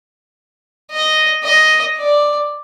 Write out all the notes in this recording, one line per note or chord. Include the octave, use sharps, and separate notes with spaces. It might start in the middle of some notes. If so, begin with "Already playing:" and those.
D#5
D#5
D5